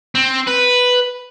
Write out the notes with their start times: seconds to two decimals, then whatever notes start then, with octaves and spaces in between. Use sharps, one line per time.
0.15 C4
0.47 B4